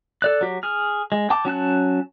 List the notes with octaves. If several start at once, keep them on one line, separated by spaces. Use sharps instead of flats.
A4 D5 F#6
F#3 G4
G#4 F6
G#3
G5 A5 D6
F#3 C#4 A5 F#6